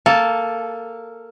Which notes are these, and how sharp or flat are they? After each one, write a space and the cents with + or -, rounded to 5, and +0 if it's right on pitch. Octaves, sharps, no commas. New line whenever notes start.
A#3 -10 A4 +0 A5 -25